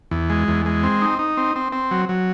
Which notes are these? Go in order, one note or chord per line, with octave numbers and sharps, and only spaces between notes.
E2
G#3
E2
G#3
C4
D#4
D#4
C4
C4
C4
F#3
F#3